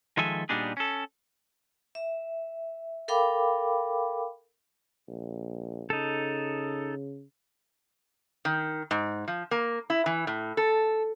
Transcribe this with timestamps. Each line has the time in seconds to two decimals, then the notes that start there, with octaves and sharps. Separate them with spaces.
0.17 D#3 F3 G#3 A4 E5 G#5
0.49 A#2 G3 B3 D4 D#4 G#4
0.77 C#4 A4
1.95 E5
3.08 A4 A#4 F5 G5 B5 D6
5.08 A#1
5.90 C#3 D#4 A4
8.45 D#3
8.91 G#2
9.28 F3
9.51 A#3
9.90 E4
10.06 E3
10.27 A2
10.57 A4